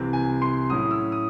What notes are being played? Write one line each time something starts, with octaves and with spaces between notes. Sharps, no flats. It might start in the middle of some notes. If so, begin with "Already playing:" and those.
Already playing: C2 C3 E3 C4
G#5
C6
A2 F#3 C#4 E4 D#6
E6
D#6